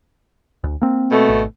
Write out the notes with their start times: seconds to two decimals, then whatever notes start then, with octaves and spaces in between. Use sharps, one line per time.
0.64 D2
0.82 A#3 C4
1.11 B2 A3
1.29 G#1